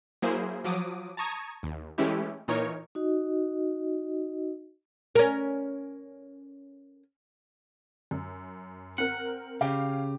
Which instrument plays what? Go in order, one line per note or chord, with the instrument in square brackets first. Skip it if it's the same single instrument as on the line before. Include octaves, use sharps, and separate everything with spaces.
[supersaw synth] F#3 A#3 E4 G#4 C5
F3 F#3 D6 D#6
A5 A#5 C#6 D#6 G#6
D#2
E3 G#3 A3 C#4 E4 G4
A#2 E3 D#4 A#4 C#5
[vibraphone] D#4 F#4 D#5
[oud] C#4 A#4
[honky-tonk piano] F#2
[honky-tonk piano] C4 A#4 [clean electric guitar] F#5
[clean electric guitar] C#3 G4 [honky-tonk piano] F5